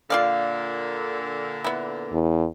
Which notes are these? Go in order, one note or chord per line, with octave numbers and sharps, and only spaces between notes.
A#2 D3 A#3 F4 D5 F5
B3 E4
E2